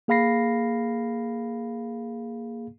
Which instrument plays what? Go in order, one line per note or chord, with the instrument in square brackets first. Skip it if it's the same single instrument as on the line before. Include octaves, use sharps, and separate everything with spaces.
[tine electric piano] A#3 G#4 F5 B5 A#6 C7